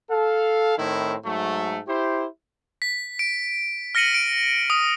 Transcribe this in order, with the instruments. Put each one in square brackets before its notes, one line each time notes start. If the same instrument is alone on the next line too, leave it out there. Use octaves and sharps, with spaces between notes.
[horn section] A4 F5
A2 D#3 C4 E4
G#2 F#3 A3
E4 G4 C5
[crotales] B6
D7
F6 A#6 C#7 D#7 F#7
D7
D#6